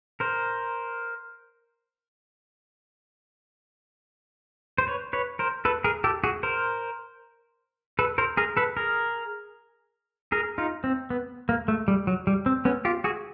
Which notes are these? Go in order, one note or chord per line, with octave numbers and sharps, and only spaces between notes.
A#4 C5
C5
B4 C#5
B4 C#5
A#4 C5
A4 B4
G#4 A#4
G4 A4
F#4 G#4
A#4 C5
A4 B4
A#4 C5
G#4 A#4
A4 B4
G#4 A#4
G#4 A#4
D#4 F4
C4
B3
A#3
A3
G3
F#3
G3
C4
B3 C#4
F4 G4
F#4 G#4